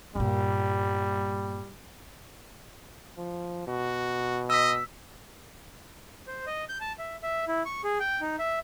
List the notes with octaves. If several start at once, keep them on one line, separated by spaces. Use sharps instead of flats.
G2 A#2 G3
F3
B2 F#4
D#5 E6 B6
C5
D#5
G6
A5
E5
E5
E4
C#6
G#4
G5
D#4
E5